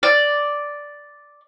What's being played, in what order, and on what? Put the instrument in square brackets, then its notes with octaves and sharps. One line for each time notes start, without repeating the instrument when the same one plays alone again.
[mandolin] D5